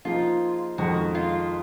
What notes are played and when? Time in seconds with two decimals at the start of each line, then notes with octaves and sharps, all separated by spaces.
0.05 F3 A#3 D#4 F4 G#4
0.78 F2 D#3 G#3 F#4
1.15 F4